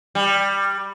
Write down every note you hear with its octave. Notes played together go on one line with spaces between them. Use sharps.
G3